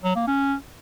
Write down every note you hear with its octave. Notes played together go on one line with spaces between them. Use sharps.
F#3
A#3
C#4